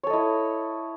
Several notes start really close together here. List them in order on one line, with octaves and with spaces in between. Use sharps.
C#5 A4 D#5 E4